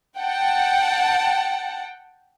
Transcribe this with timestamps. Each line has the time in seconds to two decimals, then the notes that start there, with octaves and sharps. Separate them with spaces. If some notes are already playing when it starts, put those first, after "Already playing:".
0.18 F#5 G5 A5